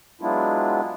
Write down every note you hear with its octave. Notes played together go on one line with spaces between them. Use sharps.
F#3 G#3 B3 D4 E4 F4